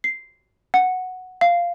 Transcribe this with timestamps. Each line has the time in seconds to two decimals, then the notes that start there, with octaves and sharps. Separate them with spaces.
0.04 C7
0.74 F#5
1.41 F5